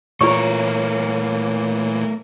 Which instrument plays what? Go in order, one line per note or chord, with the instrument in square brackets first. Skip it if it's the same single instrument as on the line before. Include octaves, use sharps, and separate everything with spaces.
[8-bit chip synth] A#2 E3 [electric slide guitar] A3 A#4 [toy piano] F4 D5 C#6 [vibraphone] C#5